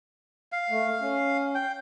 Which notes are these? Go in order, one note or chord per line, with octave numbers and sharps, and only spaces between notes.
F5
A3
C#4
G5